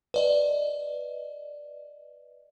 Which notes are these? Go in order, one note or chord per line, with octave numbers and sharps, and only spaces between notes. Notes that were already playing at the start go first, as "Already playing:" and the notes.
B4 D5 D#5